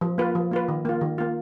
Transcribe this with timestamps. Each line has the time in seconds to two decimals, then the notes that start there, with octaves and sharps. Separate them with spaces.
0.01 F3
0.18 A#3 F4 B4
0.35 F3
0.51 A#3 F4 B4
0.68 D#3
0.85 A#3 F4
1.01 D#3
1.18 A#3 F4